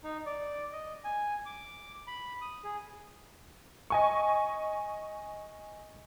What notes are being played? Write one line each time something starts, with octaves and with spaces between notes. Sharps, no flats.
D#4
D5
D#5
G#5
D6
B5
D#6
G#4
D#5 G#5 C#6